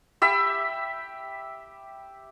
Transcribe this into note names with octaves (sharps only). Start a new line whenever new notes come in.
G4 E5 B5